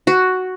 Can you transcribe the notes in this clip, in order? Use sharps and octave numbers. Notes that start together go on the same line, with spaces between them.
F#4